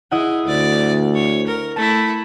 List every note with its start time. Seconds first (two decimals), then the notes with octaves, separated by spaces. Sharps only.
0.11 E4 G#4 D#5 F#5
0.47 D2 D5
1.15 C#5
1.47 A#4
1.76 A3 E4 A5